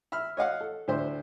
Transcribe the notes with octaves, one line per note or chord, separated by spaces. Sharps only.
E5 B5 F6
C#5 D#5 F5 F#5
A4
D2 A2 D4 C5 E5 C6